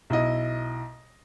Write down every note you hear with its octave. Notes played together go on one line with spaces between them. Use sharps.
B1 E4 D#5